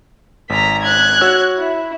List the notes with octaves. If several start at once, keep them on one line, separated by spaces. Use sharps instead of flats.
G#1 A#5 B6
F#6 G#6
F#4 C#5 E6
E4